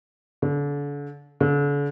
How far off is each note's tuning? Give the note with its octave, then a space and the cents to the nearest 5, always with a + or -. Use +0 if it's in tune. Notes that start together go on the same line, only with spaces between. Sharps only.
D3 -35
D3 -40